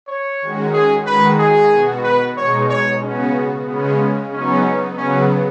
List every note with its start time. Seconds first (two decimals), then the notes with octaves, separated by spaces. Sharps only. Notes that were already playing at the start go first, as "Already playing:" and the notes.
0.08 C#5
0.42 D#3 G#3 C#4 F#4
0.74 G#4
1.06 D#3 G#3 D#4 F#4 B4
1.39 G#4
1.72 B2 B3 F#4
2.04 B4
2.37 B2 G#3 D#4 C#5
2.70 C#5
3.03 C#3 B3 C#4 F#4
3.67 C#3 G#3 B3 C#4
4.33 F#3 B3 C#4 D#4
4.98 C#3 F#3 B3 C#4